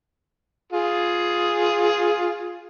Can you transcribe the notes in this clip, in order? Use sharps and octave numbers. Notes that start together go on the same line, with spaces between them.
F4 G#4